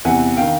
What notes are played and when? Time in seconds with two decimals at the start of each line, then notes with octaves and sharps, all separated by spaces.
0.05 E2 C3 E3 F#5 G#5
0.37 D#3 F5 G5